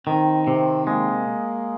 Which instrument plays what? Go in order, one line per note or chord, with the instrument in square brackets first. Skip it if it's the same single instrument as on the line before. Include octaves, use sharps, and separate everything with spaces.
[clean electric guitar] D#3 [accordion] C4
[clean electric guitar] C3 [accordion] C4
[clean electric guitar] G#3 [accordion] A#3